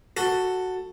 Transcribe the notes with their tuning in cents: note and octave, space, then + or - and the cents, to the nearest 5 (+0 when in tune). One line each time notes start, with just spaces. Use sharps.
F#4 +0 A4 +10